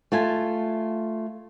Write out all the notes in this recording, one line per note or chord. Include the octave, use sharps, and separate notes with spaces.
A3 F4 E5 G#5